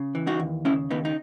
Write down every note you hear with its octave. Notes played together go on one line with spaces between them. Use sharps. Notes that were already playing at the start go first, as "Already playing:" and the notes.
Already playing: C#3
E3
D#4 F#4
D#2
C#3 C#4 E4
D#2 B3 D#4
D#4